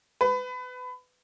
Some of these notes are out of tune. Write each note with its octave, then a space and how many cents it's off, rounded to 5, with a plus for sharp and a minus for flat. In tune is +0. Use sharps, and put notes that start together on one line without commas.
B4 +25